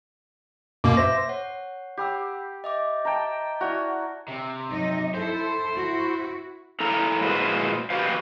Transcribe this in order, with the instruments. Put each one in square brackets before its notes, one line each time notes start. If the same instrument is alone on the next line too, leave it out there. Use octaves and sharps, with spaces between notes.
[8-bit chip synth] F#2 B2 A#3 [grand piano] D6
[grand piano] C5 E5 [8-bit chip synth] A#6
[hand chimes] C#5 F#5
[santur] G4 [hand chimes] F#5 B5 E6
[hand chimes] D#5 E5 D6
[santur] G5 A5 A#5
[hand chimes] E4 D5 E5 [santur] F#4
[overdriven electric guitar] C3
[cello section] F#3 D#4 D#5
[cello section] E4 A4 [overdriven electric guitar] C5
[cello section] E4 F#4
[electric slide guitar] E4 A4 F5 A#5
A#2 G#3 E4 F#4 B4 C5
F#4 G4 B4 C5 F5